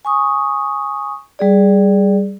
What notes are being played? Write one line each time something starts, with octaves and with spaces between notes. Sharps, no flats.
G#5 C#6 D#6
G3 G#4 D5